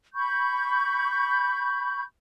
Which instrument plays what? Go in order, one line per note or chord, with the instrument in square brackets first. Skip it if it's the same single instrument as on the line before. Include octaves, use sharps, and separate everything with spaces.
[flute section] B5 C#6 G6